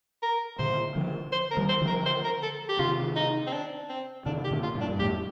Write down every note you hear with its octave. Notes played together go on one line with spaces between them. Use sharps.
A#4
A#2 D3 C5
D3 F3
C5
A#4
D#3 G3
C5
D3 F3
A#4
C5
A#4
A4
G4
C3 D#3 F4
D#4
C4
D4
C4
C3 D#3 D4
G4
A#2 D3
F4
G2 A#2
D4
G2
F2 A2 G4